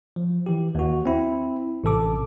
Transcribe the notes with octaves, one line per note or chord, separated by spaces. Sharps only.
F3
E3 G4
D#2 F#4
C4 E4
A1 C3 A4 D6